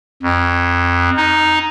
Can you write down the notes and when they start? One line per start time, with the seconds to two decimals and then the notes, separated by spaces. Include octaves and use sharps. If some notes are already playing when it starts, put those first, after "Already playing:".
0.22 F2
1.17 D#4